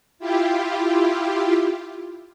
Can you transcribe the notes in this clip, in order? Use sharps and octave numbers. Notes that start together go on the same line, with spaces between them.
E4 F4 G4